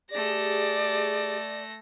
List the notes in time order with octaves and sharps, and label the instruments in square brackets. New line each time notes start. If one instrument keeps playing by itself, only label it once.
[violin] A3 A#6 [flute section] G4 G#4 [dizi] D5